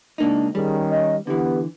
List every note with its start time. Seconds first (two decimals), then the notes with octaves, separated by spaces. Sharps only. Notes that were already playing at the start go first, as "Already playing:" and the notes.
0.18 C#2 A#3 D4 D#4
0.55 D#3 G3 C#4 G#4
0.90 D#5
1.27 D3 E3 B3 G4